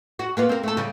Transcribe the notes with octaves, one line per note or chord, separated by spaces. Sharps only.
F#4
A#3 B3 F4
C4 A#4
A3 A4
C#3 G3